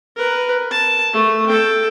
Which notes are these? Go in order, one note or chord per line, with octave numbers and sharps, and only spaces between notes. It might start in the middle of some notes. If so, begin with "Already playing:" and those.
A#4 B4
A5
A3
A4 G5